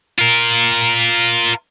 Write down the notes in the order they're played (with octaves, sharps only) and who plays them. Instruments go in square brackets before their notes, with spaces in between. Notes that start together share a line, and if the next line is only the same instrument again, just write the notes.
[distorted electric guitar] F4 A#4